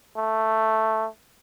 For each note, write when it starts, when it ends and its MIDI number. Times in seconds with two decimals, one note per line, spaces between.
0.17 1.06 57